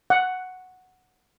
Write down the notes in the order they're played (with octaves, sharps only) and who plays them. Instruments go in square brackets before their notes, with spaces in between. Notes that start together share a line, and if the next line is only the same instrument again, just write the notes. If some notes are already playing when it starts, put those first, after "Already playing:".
[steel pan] F#5